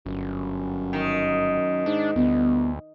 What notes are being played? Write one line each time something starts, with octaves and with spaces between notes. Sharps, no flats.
G1 F#2
D#3
G#2 D4
G1 D2 B3